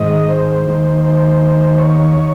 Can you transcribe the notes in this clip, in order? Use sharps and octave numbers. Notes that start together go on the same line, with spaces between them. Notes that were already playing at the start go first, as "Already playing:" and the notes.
Already playing: G#2 D#3 D#5
C5
D#2 D#3
C5
C#5
D#3